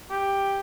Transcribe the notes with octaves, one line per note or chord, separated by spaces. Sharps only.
G4